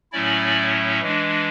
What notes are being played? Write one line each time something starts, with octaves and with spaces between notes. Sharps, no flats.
A2 F#3 A3 C#4 E4 D5
E3 G#3 D4